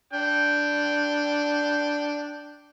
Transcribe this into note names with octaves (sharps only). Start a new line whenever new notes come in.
D4 G5